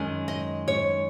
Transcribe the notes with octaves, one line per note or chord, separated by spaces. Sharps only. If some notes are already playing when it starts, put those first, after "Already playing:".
Already playing: F#2 D#3 G#3 C#4
D#5
C#5